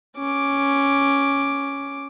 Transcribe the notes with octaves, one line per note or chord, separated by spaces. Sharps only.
C#4 D6